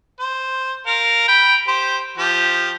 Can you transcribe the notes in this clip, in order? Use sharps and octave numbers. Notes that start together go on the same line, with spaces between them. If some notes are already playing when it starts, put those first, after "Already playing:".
C5
A#4 F5
G5 B5
G4 C5
F3 G4